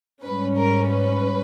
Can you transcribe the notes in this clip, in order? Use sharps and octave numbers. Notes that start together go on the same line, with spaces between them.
G#2 G3 C#4 B4
A#4
B4